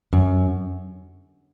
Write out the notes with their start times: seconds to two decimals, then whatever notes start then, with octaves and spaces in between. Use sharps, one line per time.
0.13 F#2